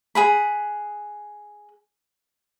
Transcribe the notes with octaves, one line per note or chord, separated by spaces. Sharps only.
G#4 F#5 B5